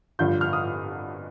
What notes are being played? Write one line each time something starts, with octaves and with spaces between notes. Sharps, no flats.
G2 D3 F3 G6
F6
D#6